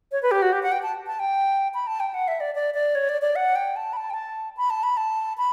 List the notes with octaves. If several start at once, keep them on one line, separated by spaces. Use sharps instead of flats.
C#5
B4
G4
F#4
G4
F#5
G5
A5
A5
G5
B5
A5
G5
F#5
E5
D5
D5
D5
C#5
D5
D5
F#5
G5
A5
B5
A5
G5
A5
B5
A5
B5
A5
B5